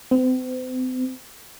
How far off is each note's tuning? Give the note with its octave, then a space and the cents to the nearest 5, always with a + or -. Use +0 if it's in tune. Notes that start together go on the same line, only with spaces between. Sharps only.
C4 -40